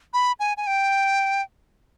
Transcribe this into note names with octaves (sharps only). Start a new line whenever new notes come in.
B5
G#5
G#5
G5